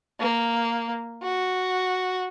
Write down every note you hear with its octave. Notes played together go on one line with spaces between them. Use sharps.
A#3
F#4